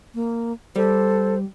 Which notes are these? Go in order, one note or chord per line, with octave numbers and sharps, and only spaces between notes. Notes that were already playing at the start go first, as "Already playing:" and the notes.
A#3
G3 A4 C5